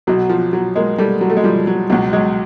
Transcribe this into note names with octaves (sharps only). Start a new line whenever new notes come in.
B1 B2 F#3
F3
F#3
G#3 A#3
G3 A3
F#3
A3
G#3
F3 G3
F#3
C#2 B2 F#3
F#3 G#3